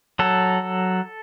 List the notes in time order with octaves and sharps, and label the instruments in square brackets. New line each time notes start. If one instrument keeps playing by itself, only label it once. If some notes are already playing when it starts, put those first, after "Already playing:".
[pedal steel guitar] F#3 A4